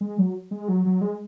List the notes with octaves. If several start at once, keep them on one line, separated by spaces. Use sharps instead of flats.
G#3
F#3
G#3
F#3
F#3
G#3